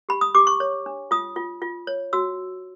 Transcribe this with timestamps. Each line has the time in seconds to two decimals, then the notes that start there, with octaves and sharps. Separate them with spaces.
0.09 G4 B5
0.21 D#6
0.35 G4 D6
0.47 C#6
0.60 C#5
0.86 D4
1.11 F4 D#6
1.36 F4
1.62 F4
1.87 C#5
2.13 F#4 E6